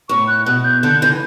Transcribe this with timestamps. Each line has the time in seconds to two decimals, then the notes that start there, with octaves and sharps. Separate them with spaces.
0.09 A2 C#6
0.27 F#6
0.46 B2 F#6
0.65 G6
0.83 D3 G6
1.02 E3 G6